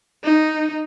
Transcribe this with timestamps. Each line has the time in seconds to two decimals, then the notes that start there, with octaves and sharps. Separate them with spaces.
0.24 D#4